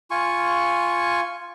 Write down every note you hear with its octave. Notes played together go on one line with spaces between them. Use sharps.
F4 G#5 C#6